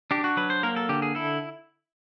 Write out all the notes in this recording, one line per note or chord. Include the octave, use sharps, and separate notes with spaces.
D4 G4
F#4
F#3 B4
C5
A#3 A#4
A4
D3 G4
G#4
E4 A4